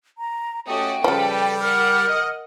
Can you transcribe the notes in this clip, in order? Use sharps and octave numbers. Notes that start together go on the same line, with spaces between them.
A#5
A3 C#4 F#4 G4 D#5 G5
C#3 F3 G3 A4 B4
A#4 F#5 F6
D#5